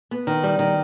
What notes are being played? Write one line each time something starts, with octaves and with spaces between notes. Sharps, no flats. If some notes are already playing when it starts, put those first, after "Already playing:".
B3
D#3
G3
D#3